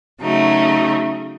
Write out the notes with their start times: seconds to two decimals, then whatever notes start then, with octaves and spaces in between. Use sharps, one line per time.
0.21 C#3 F#3 A3 D#4